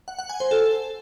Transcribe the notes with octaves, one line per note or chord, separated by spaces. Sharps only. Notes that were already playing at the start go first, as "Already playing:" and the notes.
F#5
F#5
G#5
C5
A4